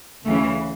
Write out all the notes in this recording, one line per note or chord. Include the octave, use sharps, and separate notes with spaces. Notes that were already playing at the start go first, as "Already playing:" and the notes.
D2 C#3 E3 A3